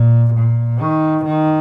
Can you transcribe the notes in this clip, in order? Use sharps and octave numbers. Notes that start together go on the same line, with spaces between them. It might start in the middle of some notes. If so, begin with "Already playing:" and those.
Already playing: A#2
A#2
D#3
D#3